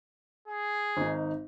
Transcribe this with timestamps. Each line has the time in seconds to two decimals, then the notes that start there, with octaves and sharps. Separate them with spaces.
0.48 G#4
0.97 G#1 D#4